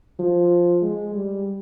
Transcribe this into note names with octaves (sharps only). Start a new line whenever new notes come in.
F3
G#3
G3